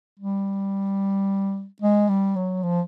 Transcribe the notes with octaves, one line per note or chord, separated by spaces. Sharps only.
G3
G#3
G3
F#3
F3